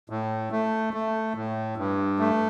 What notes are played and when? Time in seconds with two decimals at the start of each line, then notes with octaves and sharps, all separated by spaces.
0.10 A2
0.51 A3
0.94 A3
1.35 A2
1.77 G2
2.19 A3